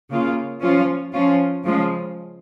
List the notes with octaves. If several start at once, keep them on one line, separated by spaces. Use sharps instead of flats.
C#3 A#3 F4
F3 C#4 F4
F3 C#4 F4
C#3 F3 G#3